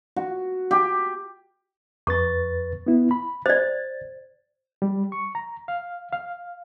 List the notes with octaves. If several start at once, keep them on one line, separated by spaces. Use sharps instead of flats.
F#4
G4
F2 B4 C#6 A6
B3 E4
B5
C5 D5 A6
G3
C#6
A#5
F5
F5